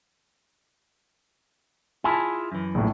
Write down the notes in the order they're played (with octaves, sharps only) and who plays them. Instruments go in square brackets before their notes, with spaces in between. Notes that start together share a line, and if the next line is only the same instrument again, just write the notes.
[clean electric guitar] E4 F4 G#4 [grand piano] G#5 A5
[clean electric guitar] F#2 E3
[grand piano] A#1 A2